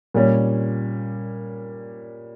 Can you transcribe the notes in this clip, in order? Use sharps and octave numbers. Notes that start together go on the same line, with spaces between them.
A#2 G3 C#4